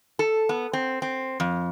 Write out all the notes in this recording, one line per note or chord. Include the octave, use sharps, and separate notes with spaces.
A4
B3
C4
C4
F2